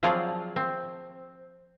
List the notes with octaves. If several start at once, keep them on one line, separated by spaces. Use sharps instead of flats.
F3 F#3 C4 F4 G#4 D5
C4